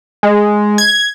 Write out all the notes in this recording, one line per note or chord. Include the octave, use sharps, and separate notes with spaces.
G#3
G#6